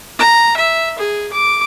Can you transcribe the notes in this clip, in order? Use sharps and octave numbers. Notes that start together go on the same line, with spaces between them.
A#5
E5
G#4
D6